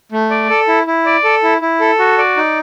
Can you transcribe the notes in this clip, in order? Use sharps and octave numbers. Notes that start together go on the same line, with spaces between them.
A3
D5
A4
E4
E4
D5
A4
E4
E4
A4
F#4
D5
D#4